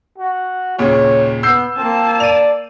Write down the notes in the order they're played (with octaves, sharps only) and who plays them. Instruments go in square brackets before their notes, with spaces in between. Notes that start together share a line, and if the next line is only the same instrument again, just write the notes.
[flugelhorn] F#4
[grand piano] D#2 A#2 C#3 [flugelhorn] C#5
[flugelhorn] B3 [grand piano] E6 G6 C7
[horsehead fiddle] A#3 A5 [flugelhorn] C4
[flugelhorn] D5 [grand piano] D#7 F7